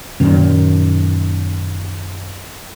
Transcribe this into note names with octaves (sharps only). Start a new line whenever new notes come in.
F#2 A#2 D#3